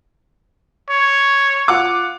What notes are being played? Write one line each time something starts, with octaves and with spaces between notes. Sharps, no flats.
C#5
F4 F#5 D6